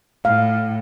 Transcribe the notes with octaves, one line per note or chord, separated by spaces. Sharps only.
A2 F5